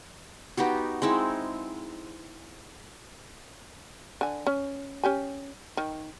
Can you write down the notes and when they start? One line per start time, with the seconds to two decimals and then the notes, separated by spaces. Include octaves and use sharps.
0.57 B3 D#4 F#4 G4
1.02 G#3 C4 D#4 E4
4.21 D3 G#5
4.46 C#4
5.03 C#4 G4 G#5
5.77 D#3